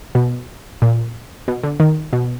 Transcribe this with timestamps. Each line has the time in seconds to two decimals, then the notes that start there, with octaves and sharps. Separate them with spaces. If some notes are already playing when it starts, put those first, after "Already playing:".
0.15 B2
0.82 A#2
1.48 B2
1.63 D3
1.80 D#3
2.13 B2